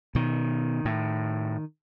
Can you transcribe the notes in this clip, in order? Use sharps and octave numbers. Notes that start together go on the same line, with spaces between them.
B2 D#3
A2